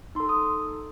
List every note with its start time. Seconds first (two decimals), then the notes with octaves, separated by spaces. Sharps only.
0.15 D#4 A4 C6
0.29 D#6